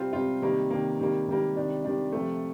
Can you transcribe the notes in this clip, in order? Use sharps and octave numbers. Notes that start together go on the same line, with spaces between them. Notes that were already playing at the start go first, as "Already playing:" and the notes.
Already playing: C3 G3 C4 F4
C3 G3 C4 F4
C3 D#3 G3 A#3
C3 D#3 G3 A#3
C3 D#3 G3 A#3
C3 D#3 G3 A#3
C3 D#3 G3 D4
C3 D#3 G3 D4
C3 F3 A3